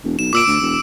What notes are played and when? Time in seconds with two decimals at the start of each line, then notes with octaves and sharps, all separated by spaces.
0.04 E1
0.19 B1 E7
0.33 A#2 D6 E6 D7
0.47 D2
0.61 E1